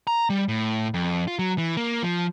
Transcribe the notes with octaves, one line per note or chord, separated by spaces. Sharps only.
A#5
G3
A2
F2
F4
F#3
E3
A#3
F3